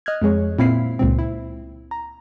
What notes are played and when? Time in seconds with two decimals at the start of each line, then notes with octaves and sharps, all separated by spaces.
0.06 D#5 F6 F#6 G#6
0.22 F2 G#3 G#4 C#5
0.59 A#2 C4 E4 F5 B6 C7
0.99 C#2 A#2 C4
1.19 E4
1.91 A#5